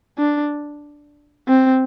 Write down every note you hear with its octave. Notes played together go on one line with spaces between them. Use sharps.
D4
C4